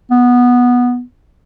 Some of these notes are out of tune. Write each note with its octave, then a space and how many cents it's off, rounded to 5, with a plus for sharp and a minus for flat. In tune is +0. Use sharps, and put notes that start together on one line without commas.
B3 -10